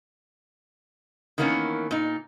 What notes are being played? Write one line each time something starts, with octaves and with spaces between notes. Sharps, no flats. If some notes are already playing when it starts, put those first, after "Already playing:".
D#3 E3 A#3 B3 C#4
A#2 D#4